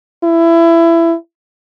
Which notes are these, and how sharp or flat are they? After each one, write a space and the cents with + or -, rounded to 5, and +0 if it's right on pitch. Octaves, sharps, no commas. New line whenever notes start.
E4 +20